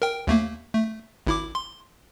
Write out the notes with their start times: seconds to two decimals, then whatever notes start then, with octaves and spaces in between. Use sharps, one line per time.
0.02 A#4 G5
0.27 D#2 A3 A#3
0.74 A3
1.27 G#1 E4 D6
1.55 C6